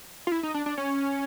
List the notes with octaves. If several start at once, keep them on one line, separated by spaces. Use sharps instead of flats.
F4
E4
D#4
D4
D4
C#4